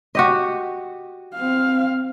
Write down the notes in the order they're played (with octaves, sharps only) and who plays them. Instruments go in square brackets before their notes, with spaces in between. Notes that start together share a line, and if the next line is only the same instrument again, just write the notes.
[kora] F#4 G4 D#5
[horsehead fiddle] C4 F5